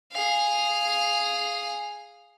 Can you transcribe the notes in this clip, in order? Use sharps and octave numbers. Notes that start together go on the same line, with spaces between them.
G#4 F5